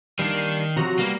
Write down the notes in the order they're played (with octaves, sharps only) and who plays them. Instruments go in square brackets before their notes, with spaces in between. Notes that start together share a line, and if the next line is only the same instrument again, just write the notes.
[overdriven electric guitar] D#3 [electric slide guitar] G3 A#3 D4 [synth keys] C7
[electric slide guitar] C3 F3 F#3 [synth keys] F#4 A#5
[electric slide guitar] G3 B3 G4 [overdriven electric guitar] A#3